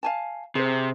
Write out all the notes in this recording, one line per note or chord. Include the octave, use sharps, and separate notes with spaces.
F5 G#5 A5
C3 G#4 C5